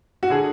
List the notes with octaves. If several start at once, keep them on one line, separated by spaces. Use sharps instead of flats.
F#4
D3 G#4